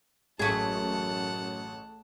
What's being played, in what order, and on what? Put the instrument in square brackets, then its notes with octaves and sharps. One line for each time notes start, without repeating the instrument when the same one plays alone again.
[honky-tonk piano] A1 D#6 [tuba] F#2 [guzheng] A3 G#4 [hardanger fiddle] F#5 A5